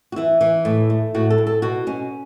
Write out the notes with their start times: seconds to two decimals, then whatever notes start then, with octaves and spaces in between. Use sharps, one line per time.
0.12 F#4
0.16 E3 E4
0.41 E3
0.65 A2
0.90 A3
1.15 A2 F#4
1.30 A4
1.38 A2
1.47 A4
1.62 B2 F#4
1.87 B2 C#4